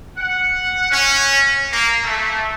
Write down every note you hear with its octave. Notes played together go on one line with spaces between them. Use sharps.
F#5
C#4
A#3
A3